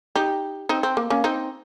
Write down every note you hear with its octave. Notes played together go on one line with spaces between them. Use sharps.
D#4 G4
C4 D#4
C4
A#3
A#3 C#4
C4 D#4